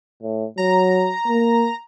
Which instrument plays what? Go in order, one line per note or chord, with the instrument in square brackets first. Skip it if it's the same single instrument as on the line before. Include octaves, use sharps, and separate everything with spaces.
[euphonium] A2
[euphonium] F#3 [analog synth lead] A#5
[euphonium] A#3